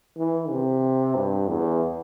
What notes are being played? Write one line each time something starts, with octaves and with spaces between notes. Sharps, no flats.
E3
C3
G2
E2